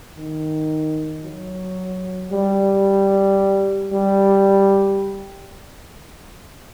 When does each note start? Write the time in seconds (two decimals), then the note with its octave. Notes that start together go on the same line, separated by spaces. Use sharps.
0.16 D#3
1.23 F#3
2.32 G3
3.93 G3